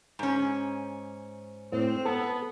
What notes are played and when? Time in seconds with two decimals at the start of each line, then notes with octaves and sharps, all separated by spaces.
0.19 G#2 C#4
1.72 A2 C4
2.05 B3 A4